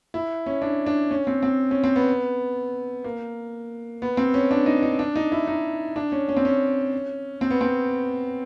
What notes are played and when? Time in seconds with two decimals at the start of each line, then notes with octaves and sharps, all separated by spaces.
0.14 E4
0.46 C#4
0.62 D4
0.86 D4
1.11 C#4
1.27 C4
1.43 C4
1.71 C#4
1.84 C4
1.96 B3
3.04 A#3
4.02 B3
4.17 C4
4.34 C#4
4.51 D4
4.66 D#4
4.82 D#4
4.99 D4
5.16 D#4
5.32 E4
5.47 D#4
5.96 D4
6.12 C#4
6.29 C#4
6.37 C4
6.45 C#4
7.41 C4
7.50 B3
7.61 C4